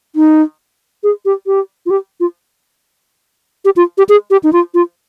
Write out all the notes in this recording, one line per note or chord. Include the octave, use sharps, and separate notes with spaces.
D#4
G#4
G4
G4
F4
G4
F4
G4
F4
G4
G#4
G4
D#4
F4
F4